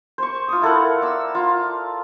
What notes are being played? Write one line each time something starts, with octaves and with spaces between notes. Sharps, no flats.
C5 C#6
F4 D#6
E4 A4 A#4 F#5
D5 E6
F4